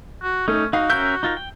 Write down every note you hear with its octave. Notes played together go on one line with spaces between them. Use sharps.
F#4
A3 C#4 D#4
D#4 F#4 F5
C#4 A#4 E5 G6
D#4 F4 A#4
G5